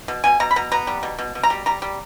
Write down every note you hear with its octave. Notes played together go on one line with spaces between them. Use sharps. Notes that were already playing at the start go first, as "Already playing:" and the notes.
B2
B2 G#5
B2 A#5
B5
B2 A#5
B3 A#5
G3
B2
B2
B2
A#5
G3
G3 A#5
G3